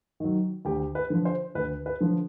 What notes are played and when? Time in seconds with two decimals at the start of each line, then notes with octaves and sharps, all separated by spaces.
0.20 D#3 F#3
0.65 D2 G4
0.95 B4
1.10 D3 F3
1.25 C5
1.55 D2 B4
1.86 B4
2.01 D3 F3